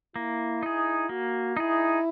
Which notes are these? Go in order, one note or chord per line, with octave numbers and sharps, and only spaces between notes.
A#3 E4
D#4 G#4
A#3 F#4
D#4 E4 G#4